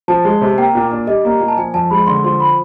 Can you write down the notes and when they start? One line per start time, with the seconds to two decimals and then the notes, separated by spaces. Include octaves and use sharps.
0.08 F3 A5
0.25 G#3
0.41 C3
0.57 A#3 G5
0.75 A#2
0.92 D4
1.07 G3 D#5
1.25 A#3
1.40 A#2
1.48 A5
1.57 F3 G#5
1.74 F2 A5
1.91 G#3 B5
2.07 D3 C6
2.24 F3 C6
2.40 B5